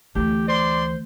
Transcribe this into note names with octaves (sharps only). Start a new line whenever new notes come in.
D2 E3 A3 G4
C5 D5 C6